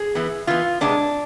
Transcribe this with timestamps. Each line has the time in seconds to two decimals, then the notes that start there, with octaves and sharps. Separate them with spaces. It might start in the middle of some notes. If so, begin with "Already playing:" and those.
Already playing: G#4
0.15 E3 B3
0.47 E3 B3 F4
0.81 C3 G#3 B3 D4